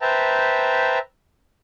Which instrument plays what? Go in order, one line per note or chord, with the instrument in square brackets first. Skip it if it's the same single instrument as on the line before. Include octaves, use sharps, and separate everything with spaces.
[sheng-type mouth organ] B4 C5 E5 G5 A5 A#5